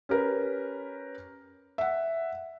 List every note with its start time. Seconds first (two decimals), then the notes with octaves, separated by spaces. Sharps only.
0.09 C#4 G4 A#4 B4
1.78 E5 F#5